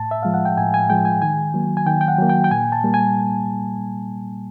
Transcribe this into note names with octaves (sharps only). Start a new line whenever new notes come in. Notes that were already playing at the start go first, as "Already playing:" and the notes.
Already playing: A2 A5
E5
F3 G#3 F5
F#5
G5
A2 G#5
G#5
F3 G#3 G5
G#5
D#3 G#5
F#3 A#3
G#5
D#3 G5
G5
F#5
F#3 A#3
G5
G5
A#2 G#5
A5
G3 A#3
G#5